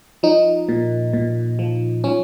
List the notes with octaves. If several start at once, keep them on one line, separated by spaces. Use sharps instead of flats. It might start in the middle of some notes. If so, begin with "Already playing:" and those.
F3 D#4
A#2
A#2
F3
F3 C#4